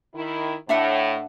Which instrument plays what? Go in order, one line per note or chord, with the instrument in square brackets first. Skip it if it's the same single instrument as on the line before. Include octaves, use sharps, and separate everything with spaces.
[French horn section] D#3 E4
[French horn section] A2 [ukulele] D4 E5 F#5